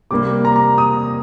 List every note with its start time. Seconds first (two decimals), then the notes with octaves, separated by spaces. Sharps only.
0.11 C3 G3 A#3 D6
0.45 A#5
0.56 A#5
0.78 D#6